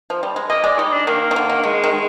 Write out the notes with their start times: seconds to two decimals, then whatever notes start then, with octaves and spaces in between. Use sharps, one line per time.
0.10 F3
0.23 G3
0.36 G#3
0.50 A#3 D#5
0.64 G#3 D5
0.79 G3 D#4
0.93 D4
1.07 D#3 A#3
1.31 D#3
1.36 D3
1.50 D#3
1.64 D#3 G#3
1.84 D#3
1.93 G#3